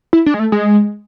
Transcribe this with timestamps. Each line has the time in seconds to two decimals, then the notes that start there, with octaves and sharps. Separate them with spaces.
0.13 E4
0.26 D4
0.34 G#3
0.39 A3
0.52 G#3